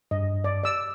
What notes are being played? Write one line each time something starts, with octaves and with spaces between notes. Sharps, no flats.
G2 D#5
D5
D5 E6